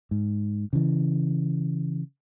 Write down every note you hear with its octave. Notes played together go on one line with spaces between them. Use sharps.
G#2
C#3 E3